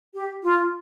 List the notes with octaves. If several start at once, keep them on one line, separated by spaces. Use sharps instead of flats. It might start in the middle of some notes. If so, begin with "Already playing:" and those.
G4
F4